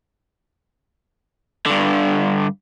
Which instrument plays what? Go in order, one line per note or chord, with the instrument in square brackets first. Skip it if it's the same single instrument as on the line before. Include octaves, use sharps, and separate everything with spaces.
[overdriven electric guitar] G2 D3